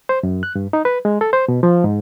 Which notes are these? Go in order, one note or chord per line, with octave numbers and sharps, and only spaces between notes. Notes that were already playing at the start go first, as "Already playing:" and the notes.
C5
F#2
F#6
G2
D#4
B4
G#3
A4
C5
B2
F3
G#2